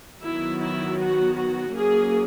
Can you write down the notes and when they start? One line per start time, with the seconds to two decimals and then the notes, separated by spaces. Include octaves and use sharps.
0.22 D#3 F#3 B3 E4
0.60 E4
0.98 F#4
1.35 F#4
1.73 F#3 A#3 C#4 G#4